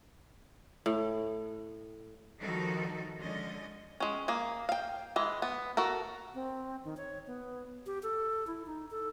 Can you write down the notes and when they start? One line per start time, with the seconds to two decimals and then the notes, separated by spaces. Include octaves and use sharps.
0.86 A2
2.39 D#3 F3 G3 D#4 F#4 A4
3.19 D3 F3 G#3 C#4 D#5
4.00 G#3 C#4
4.28 A#3 G#4
4.69 F5 G5
5.16 E3 G#3
5.42 B3
5.77 F#4 A4 A#4
6.35 C4
6.84 D#3
6.97 C#5
7.27 B3
7.86 G4
8.03 A4
8.47 E4
8.66 D#4
8.91 A4